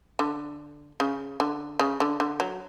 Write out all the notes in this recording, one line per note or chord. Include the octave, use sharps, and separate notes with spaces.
D3
C#3
D3
C#3
D3
D3
F#3